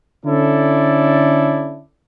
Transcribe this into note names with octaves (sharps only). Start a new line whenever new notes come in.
D3 C#4 E4 A4 D5